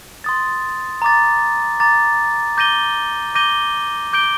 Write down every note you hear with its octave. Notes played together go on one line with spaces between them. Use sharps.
C6 D#6 A6
A#5 D6 A6
A#5 D6 A6
D6 G6 A#6 D#7 G7
D6 G6 A#6 D#7 G7
D6 G6 D7 G7